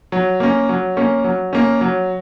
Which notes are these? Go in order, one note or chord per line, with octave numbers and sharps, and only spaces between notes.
F#3
A#3 C#4
F#3
A#3 C#4
F#3
A#3 C#4
F#3